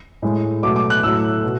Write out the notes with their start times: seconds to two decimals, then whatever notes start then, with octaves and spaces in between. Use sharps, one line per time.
0.22 A2 G#3
0.63 B2 F#3 A3 D6
0.76 D6
0.90 F#6
1.03 A2 F#3 A3 E6
1.43 B2